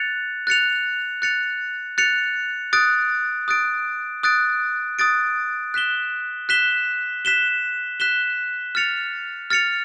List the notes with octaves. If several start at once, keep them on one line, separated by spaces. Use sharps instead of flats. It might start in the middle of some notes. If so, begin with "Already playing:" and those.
Already playing: F#6 A6 C#7 F7
F#6 A6 C#7 F7
F#6 A6 C#7 F7
F#6 A6 C#7 F7
D#6 F#6 A6 D7
D#6 F#6 A6 D7
D#6 F#6 A6 D7
D#6 F#6 A6 D7
F#6 B6 E7 G7
F#6 B6 E7 G7
F#6 B6 E7 G7
F#6 B6 E7 G7
F6 A6 C#7 F7
F6 A6 C#7 F7